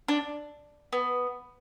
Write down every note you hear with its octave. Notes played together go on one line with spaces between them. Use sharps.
D4
B3